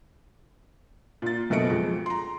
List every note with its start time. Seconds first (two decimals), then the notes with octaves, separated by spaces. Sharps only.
1.22 A#2 A6
1.50 F#1 B2 A3 D#5 C#7 D7
1.70 F2 G#3
2.06 A#5 C6